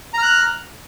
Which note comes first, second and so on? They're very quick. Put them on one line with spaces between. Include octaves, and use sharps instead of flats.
A#5 F6 F#6